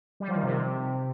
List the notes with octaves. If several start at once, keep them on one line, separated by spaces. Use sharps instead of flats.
G3
F3
D#3
C3